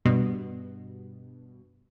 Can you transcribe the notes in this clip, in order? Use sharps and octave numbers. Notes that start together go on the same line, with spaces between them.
G2 B2